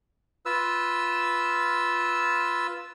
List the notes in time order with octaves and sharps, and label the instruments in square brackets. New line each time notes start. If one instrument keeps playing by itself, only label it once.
[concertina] F4 B4 E6